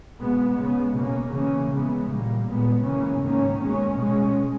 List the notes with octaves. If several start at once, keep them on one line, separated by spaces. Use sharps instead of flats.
B2 G#3 B3
C#3 G#3 B3
B2 A#3 C#4
C#3 E3 A#3 C#4
C#3 E3 G#3 B3
A#2 G3 A#3
A#2 G#3 B3
C#3 E3 A#3 C#4
G#2 D#3 A#3 C#4
B2 G#3 C#4
B2 G#3 C#4